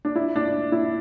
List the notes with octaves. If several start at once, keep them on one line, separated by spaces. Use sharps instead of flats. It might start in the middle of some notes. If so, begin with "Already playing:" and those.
D4
E4
D4
E4